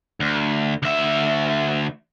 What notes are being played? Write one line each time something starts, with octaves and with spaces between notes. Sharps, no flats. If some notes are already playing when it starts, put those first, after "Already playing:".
D2
D2 E5